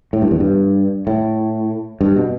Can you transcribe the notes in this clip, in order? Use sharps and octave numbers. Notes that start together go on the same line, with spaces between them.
A2
G2
E2
G2
A2
G2
B2